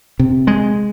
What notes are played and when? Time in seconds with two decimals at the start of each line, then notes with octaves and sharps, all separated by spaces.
0.19 C3
0.47 G#3